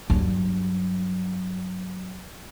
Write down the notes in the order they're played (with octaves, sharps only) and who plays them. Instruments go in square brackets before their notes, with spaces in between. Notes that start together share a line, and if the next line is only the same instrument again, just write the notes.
[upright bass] G2 F#3